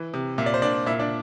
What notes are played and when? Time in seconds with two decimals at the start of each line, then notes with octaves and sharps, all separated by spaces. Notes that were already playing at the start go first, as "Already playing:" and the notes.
Already playing: E3
0.14 C3
0.38 A#2 E5
0.46 D5
0.54 C5
0.62 A#2 D4 D5
0.86 A#2 E4 E5
0.99 D4 D5